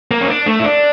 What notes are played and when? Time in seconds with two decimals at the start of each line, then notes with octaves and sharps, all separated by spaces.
0.11 A#3
0.21 C#4
0.28 D4
0.46 A3
0.60 E4
0.64 D4